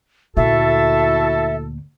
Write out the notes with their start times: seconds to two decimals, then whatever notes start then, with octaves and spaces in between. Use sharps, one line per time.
0.37 D2 A#2 E4 F#4 A4 E5